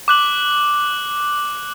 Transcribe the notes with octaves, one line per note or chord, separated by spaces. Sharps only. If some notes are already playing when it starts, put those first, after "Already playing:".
D6 F#6 F#7